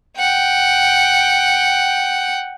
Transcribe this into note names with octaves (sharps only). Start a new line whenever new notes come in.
F#5 G5